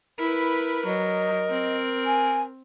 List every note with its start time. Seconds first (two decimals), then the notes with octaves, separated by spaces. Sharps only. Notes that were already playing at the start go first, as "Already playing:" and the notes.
0.19 E4 A#4 B4
0.86 F#3 D#5
1.50 C4
2.06 G#5